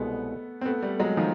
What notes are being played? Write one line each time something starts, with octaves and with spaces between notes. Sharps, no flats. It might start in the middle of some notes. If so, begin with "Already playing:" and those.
Already playing: C2 B2 G#3 A3 B3
C4
A3 B3
G3 A3
F#3 G#3
D#3 F3